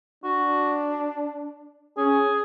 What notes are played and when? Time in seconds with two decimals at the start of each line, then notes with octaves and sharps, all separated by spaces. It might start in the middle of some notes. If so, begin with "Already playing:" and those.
0.24 D4 F#4
1.97 C#4 G#4